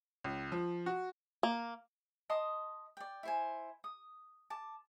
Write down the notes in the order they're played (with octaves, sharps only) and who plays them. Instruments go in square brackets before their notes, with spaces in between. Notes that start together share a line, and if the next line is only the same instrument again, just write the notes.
[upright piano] C#2
F3
F#4
[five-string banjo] A#3
[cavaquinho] D#5 A5 C6 D#6
D5 G5
E4 C5 G#5
D#6
A5 D6